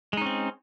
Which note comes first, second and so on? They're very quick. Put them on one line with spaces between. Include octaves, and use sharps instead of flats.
G#3 D#4 C#4 C4